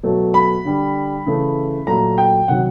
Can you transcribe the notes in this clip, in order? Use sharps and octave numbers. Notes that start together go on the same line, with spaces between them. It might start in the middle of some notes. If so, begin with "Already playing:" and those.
B2 F#3 A3
B5
D3 G3
C#3 E3 A3
A#2 F#3 A3 A#5
G5
C3 D#3 F#3 F#5